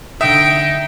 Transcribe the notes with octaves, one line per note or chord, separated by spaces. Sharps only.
D3 D#4 E5 G5 D#6